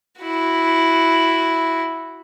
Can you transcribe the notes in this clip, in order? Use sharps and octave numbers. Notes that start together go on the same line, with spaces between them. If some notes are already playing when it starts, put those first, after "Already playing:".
E4 F#4